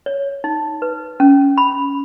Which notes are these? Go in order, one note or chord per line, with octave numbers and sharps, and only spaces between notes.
C#5
D#4
B4
C#4
B5